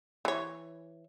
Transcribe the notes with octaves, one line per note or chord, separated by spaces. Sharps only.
E3 C#5